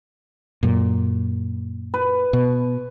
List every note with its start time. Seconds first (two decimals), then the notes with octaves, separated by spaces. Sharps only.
0.63 F#2 A#2
1.94 B4
2.33 B2